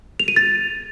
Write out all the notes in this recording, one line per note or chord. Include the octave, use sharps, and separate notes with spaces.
F7
D#7
A6